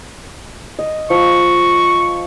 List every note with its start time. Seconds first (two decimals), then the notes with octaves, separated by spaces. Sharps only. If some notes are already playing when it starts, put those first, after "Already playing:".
0.79 D#5
1.10 F3 C#6